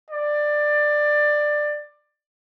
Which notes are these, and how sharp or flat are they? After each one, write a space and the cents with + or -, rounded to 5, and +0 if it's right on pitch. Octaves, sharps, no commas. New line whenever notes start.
D5 +15